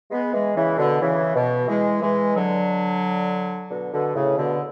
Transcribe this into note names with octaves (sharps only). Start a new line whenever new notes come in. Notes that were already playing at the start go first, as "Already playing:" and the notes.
G#3 B3
E3 G#3
C#3 E3
B2 D3
C#3 E3
B2
E3 G#3
E3 G#3
D3 F#3
B2 D3
B2 D3
A2 C#3
B2 D3